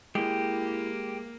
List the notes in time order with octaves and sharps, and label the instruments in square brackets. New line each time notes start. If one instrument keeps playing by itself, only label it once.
[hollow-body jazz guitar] G#3 [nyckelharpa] A#3 [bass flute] E4 [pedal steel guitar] G4